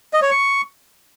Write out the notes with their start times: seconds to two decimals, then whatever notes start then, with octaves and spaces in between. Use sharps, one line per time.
0.13 D#5
0.22 C#5
0.31 C#6